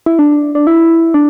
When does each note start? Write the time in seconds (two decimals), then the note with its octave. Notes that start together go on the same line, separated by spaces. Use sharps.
0.06 E4
0.19 D4
0.55 D4
0.67 E4
1.14 D4